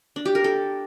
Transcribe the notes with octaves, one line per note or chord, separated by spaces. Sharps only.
D4
G4
A#4
A4